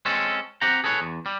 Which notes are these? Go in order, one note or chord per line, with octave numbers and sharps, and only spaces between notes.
G#3 C4 C#4 A4
C4 G4 F#5 G5 A#5
G#4 A4 B4 C#5
E2
G3